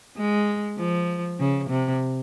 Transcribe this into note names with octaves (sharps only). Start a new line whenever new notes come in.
G#3
F3
C#3
C3